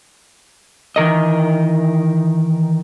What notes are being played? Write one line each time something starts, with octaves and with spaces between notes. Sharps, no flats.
D#3 E3 A#4 D#5